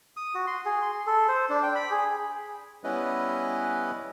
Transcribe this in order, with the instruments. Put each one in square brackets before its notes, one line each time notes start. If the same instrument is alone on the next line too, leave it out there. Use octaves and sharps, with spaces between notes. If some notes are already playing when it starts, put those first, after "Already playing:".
[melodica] D#6
F#4
C6
G#4
C6
A4
C5
D4
G5
B5
G#4
[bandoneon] G3 B3 C#4 E4 B4 D#5